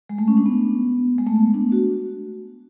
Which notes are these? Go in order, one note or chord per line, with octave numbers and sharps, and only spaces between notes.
G#3
A3
C#4
D4
B3
G#3
A3
B3
D4
F#4